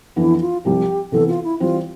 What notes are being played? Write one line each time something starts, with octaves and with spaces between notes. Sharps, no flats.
F2 E3 B3 D4 E4
F4
C2 C3 F3 G4
C3 E3 B3 A4
F4
E4
E3 G3 C4 F4